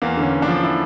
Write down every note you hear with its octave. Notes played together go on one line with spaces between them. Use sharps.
E2 A#3
D3
C#4
E2
D4
F3
E4